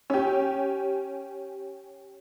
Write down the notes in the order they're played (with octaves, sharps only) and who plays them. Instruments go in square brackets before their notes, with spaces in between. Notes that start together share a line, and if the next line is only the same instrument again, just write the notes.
[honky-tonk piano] C#4 G4